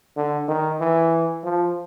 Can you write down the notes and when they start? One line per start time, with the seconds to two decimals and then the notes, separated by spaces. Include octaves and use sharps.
0.17 D3
0.48 D#3
0.81 E3
1.44 F3